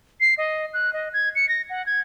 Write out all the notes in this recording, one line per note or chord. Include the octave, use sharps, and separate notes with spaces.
C7
D#5
F#6
D#5
G#6
C#7
A#6
F#5
G#6